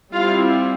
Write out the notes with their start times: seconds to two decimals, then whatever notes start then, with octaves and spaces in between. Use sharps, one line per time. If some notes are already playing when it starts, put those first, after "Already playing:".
0.12 G3 C4 E4 F4 F5